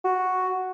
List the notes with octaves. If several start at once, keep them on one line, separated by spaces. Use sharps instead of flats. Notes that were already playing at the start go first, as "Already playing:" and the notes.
F#4